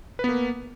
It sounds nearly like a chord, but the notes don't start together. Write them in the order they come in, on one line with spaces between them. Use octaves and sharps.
B4 B3 A#3